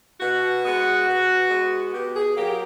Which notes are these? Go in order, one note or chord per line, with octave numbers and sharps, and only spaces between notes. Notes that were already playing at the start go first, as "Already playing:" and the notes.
B2 F#4
G#3 B3
B2
G#3 B3
B2 G4
G#4
F#3 A#3 G4